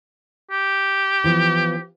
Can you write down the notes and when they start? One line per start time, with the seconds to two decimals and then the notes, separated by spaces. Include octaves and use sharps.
0.51 G4
1.24 E3 F3 B3